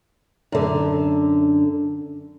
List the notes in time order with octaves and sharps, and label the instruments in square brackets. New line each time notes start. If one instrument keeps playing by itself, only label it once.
[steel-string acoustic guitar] F#2 D3